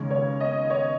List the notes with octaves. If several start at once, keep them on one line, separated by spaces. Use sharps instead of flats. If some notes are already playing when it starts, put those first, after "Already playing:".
Already playing: D#2 C#3 G#3 C#4
C#5
D#5
C#5